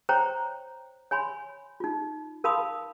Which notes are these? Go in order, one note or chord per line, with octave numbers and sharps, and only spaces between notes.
C5 C#5 G5 A#5
C#5 G#5 B5 C6
D#4 F4
A#4 F5 A5 B5 C6 D#6